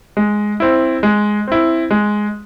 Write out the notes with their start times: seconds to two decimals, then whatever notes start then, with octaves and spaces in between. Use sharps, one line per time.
0.17 G#3
0.60 C4 E4
1.03 G#3
1.47 C4 E4
1.91 G#3